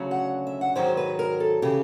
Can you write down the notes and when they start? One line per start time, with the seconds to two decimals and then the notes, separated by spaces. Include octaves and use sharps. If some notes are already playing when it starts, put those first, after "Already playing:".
Already playing: D2 C#3 F#3
0.11 F#5
0.47 E5
0.61 F#5
0.75 G#2 D#3 F#3 C5
0.97 B4
1.19 A#4
1.40 A4
1.62 C#3 E3 G4